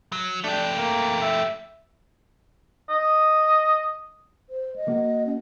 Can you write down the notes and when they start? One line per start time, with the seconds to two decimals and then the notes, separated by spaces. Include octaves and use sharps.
0.12 F#3
0.44 A3 D4 G4
0.78 A#3
1.22 E5
2.90 D#5
4.49 C5
4.76 D#5
4.88 A#3 F#4
5.26 C#4